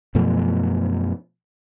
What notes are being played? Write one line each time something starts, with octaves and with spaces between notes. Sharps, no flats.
F#2 B2 F3 A3